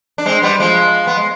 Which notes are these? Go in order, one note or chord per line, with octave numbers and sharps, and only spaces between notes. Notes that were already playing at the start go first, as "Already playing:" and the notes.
D4
G#3 C4
G3 B3
F3 G#3
B3
G#3